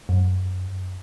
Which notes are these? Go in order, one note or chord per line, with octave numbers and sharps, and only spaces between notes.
F#2